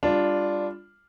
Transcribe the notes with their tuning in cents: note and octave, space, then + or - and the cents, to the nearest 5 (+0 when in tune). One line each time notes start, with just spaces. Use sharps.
G3 +30 D4 +0 F4 +0